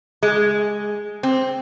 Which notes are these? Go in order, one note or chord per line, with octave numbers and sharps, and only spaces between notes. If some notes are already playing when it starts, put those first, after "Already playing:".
G#3
C4